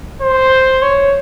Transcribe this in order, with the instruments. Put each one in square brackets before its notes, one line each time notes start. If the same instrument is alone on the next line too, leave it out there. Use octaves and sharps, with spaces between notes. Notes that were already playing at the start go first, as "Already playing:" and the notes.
[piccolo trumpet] C5
C#5